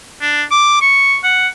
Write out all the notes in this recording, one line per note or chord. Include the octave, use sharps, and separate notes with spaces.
D4
D6
C#6
F#5